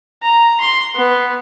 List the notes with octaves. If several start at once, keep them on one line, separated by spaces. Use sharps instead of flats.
A#5
C6
B3